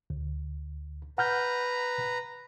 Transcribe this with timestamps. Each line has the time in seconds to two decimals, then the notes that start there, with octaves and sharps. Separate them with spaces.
0.10 D2
1.18 B4 F#5 A#5 F6 G6